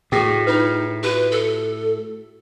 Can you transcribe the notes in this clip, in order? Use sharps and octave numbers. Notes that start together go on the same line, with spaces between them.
A2 F#4 G#4 A4 G5
D#4 F4 B4
F#4 G4 B4
A4